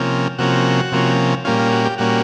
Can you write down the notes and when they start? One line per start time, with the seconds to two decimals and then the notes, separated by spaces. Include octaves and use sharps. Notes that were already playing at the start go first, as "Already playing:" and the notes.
Already playing: C3 F3 A#3 C#4
0.38 C3 F3 A#3 C#4 F#4
0.92 C3 F3 A#3 C#4
1.45 A#2 G3 A#3 C#4 F4
1.59 F4
1.72 F#4
1.85 G4
1.98 A#2 G3 A#3 C#4 F#4